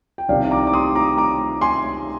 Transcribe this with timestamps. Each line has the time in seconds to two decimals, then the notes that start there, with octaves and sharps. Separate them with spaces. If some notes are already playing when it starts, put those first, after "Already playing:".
0.18 G5
0.29 C2 C3 D#3 D5 F5
0.51 A#5 D6
0.67 D6
0.74 C6 D#6
0.95 A#5 D6
1.17 A#5 D6
1.61 G#5 C6